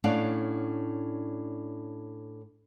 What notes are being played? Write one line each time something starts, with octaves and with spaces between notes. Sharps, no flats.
A2 C#4 D4 D5 F5 F#5